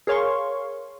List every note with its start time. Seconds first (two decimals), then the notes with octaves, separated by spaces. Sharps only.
0.07 G#4 A#4 C#5 F5 C6 C#6